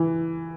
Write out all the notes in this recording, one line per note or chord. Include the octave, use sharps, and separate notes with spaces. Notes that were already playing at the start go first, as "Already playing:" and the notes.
Already playing: E3